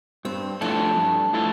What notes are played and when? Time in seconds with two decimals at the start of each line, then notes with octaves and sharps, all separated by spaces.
0.25 G2 C4
0.61 F3 A3 D4 E4 A4
0.97 G2
1.33 F3 A3 E4 A4